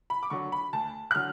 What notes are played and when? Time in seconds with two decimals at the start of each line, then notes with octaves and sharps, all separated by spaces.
0.10 B5
0.23 D6
0.30 D3 F#3 C#6
0.52 B5
0.73 D2 A5
1.11 F#6
1.15 D3 F#3 F6